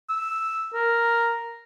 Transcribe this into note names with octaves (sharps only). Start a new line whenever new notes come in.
E6
A#4